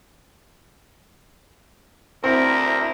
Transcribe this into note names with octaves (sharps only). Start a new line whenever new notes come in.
D2 C4 E4 A#4